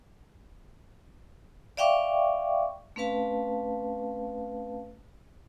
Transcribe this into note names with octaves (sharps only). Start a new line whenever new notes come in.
D5 E5 F5 G5 C#6 D6
A3 C4 C#4 B4 F5 A5